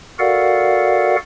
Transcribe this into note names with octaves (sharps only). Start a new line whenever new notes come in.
F#4 A4 A#4 D5 F5 F#5